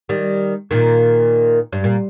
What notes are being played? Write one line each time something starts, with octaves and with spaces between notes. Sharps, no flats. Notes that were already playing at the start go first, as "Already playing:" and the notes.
D#3 G3
A#2 D#3
G2
A#2